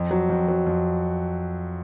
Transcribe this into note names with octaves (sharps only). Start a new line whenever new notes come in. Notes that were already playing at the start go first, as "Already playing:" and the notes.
Already playing: F2
F#3
F2
F#3
F2